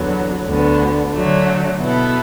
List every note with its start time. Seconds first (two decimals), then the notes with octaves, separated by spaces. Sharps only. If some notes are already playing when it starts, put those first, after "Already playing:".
Already playing: E2 D3 F#3 B3
0.47 D2 D3 B3
1.13 D3 F#3 A3
1.80 B2 B3 E4 A4